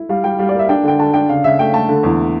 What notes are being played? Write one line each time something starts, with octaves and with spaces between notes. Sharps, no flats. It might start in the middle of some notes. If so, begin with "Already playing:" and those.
Already playing: E4
G3 F5
G3 G5
G3 F5
D5
A#3 E5
D4 G5
D3 G5
D3 A5
D4 G5
C#3 F5
C#3 E5
A3 G5
A3 A5
D3
E2